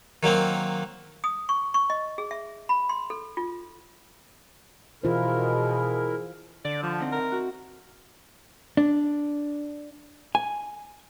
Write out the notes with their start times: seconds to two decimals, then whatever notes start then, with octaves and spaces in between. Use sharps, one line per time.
0.23 D#3 F#3 A#3 C4
1.24 D#6
1.49 C#6
1.74 C#6
1.90 D#5
2.18 G#4
2.31 E5
2.69 B5
2.89 C6
3.10 A4
3.37 F4
5.03 B2 E3 E4 F4 G#4 A#4 C5
6.65 D3 D5
6.83 F3
6.98 C4 D#4 E4
7.12 A#4
7.32 F#4
8.77 D4
10.35 G#5